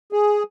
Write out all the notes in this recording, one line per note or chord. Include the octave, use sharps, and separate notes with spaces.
G#4